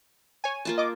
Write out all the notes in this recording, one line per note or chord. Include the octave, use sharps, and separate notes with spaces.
C#5 G#5
A#3 F4 A5
D#5 D6